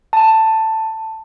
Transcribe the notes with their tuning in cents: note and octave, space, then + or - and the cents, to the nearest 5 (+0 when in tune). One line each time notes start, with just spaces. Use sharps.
A5 +10